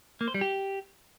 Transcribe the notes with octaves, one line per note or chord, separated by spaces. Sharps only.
A#3
C5
G3
G4